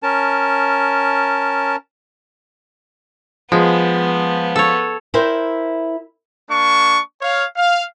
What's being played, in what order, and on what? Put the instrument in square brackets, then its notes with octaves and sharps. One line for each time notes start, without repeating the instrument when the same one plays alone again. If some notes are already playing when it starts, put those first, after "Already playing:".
[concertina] C#4 A#4 A5
[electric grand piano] F3 [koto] G#3 [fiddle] B3
[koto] A4 C#5
[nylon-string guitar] E4 A#4 C5 E5 G5
[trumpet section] A#3 D4 C#6
C#5 F5
F5